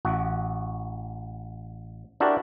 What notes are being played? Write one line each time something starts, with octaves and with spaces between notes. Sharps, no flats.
A1 F#4
D4 E4 F#4 G4 A#4 D5